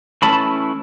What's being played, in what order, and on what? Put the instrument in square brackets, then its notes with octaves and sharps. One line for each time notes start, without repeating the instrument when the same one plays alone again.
[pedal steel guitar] E3 A3 C#4 E4 A5 B5